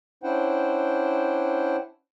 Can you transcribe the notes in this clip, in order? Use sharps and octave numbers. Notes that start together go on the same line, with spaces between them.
C#4 D4 E4 C5 F#5 G5